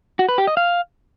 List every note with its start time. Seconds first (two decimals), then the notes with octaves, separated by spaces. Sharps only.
0.19 F#4
0.29 B4
0.38 G4
0.47 D#5
0.57 F5